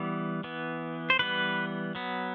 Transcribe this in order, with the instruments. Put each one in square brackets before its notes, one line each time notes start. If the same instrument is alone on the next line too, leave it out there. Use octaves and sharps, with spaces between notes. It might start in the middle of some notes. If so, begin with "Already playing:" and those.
Already playing: [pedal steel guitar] E3 G3 B3
E3 B3
C5
E3 G3 B3 B4
F#3 B3